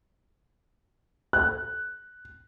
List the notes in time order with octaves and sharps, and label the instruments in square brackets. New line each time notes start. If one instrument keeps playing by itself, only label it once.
[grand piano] F#6